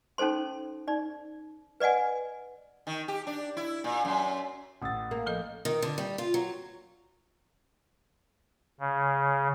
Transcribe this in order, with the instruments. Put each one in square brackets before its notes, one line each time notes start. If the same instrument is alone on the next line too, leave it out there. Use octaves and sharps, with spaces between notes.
[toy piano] C#4 D#4 A4 C5 C6
D#4 D5
B4 D5 D#5 F#5 G#5
[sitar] D#3
G4
D4
E4
A#2
F#2
[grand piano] A1 A6 [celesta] F#5 D#6 E6
[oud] A#3
[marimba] F3 A4 D#5
[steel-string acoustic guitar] D#3
D3
G3
F4
F#3
[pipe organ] C#3